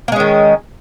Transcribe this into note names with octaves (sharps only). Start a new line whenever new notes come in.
D#3 G#3 A#3 C#4